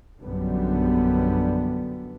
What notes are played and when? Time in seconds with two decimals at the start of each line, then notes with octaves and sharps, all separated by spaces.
0.21 A#1 F#2 D3 G3 B3